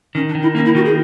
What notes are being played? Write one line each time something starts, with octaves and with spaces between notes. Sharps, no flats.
D#3 C#4
D4
D#3
E4
A#3 C#4
E4
D#3 F#4
G#4